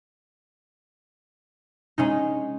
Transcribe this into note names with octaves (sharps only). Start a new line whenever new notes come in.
G#3 C#4 D#4